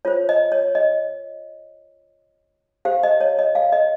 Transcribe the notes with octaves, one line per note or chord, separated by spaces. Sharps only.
F4 C5 C#5
D#5
C#5
D#5
G4 C5 F5
D#5
C#5
D#5
F5
D#5